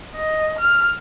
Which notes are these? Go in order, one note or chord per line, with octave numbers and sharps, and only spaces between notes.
D#5
F6